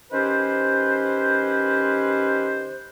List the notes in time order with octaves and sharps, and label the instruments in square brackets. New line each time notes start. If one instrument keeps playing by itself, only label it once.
[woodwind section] D#3 C#4 G4 B4 C5